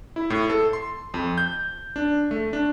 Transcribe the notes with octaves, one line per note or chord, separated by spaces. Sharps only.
E4
A2
A4
C6
F2
G6
D4
A3
D4